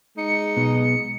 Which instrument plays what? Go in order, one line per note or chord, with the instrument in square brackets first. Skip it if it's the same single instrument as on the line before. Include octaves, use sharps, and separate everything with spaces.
[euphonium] G#3 [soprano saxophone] D#4 [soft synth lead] C#7
[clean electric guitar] B1 B2 B3